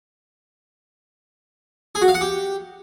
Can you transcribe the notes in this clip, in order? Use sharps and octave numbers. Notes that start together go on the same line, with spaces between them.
G#4
F#4
F5
F#5
G4